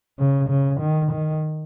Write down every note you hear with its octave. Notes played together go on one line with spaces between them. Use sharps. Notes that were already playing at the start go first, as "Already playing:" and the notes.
C#3
C#3
D#3
D#3